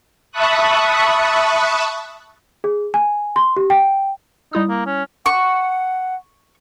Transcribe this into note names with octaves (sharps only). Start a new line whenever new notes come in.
E5 A5 B5 C#6 D#6 F#6
G#4
G#5
C6
G4
G5
G3 D#4 E4 D#6
A#3
C#4
F#5 C#6